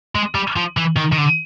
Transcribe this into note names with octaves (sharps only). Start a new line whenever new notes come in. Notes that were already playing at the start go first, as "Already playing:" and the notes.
G#3
G3
F3
E3
D#3
D#3
D3